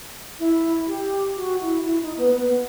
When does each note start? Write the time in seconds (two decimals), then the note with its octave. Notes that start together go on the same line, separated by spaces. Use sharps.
0.39 E4
0.87 G4
1.36 F#4
1.61 E4
1.85 E4
2.01 D#4
2.17 B3
2.33 B3